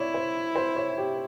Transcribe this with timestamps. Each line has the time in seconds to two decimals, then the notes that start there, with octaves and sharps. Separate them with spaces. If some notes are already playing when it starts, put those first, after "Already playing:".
Already playing: E4 C#5 D5
0.14 C5
0.56 C5
0.76 C#5
0.98 G4